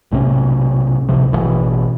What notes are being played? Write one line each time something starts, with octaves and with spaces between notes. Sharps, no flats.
B1 A2 C3 C#4
A1 D2 C3 F3
A1 G2 B2 E3